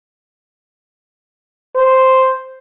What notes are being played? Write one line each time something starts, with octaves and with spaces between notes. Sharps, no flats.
C5